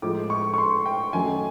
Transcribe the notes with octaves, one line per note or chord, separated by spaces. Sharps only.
A2 F3 G#3 D6
C#6
C#6
C6
G5
F#2 D#3 F#3 A3 G#5